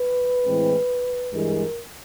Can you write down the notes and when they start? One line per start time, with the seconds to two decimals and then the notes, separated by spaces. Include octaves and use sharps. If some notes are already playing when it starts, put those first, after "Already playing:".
Already playing: B4
0.45 A2 E3 G#3 C4
1.33 G2 E3 G#3 A#4